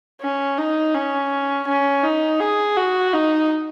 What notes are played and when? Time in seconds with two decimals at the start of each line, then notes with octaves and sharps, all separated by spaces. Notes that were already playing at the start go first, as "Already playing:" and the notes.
0.21 C#4
0.58 D#4
0.94 C#4
1.67 C#4
2.03 D#4
2.40 G#4
2.77 F#4
3.13 D#4